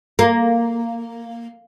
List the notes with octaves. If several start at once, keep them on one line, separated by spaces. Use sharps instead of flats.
A#3